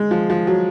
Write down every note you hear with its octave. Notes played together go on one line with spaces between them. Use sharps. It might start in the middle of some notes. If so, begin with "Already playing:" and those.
Already playing: G#3
F3
F3
F#3